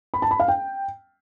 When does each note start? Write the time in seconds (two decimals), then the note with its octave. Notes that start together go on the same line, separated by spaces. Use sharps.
0.14 B5
0.22 A5
0.31 B5
0.40 F5
0.48 G5